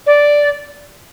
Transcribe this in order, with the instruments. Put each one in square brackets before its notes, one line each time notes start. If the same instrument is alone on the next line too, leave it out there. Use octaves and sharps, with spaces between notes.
[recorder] D5